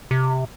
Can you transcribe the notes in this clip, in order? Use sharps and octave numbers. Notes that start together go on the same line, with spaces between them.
C3